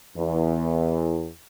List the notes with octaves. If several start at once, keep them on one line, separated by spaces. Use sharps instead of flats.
E2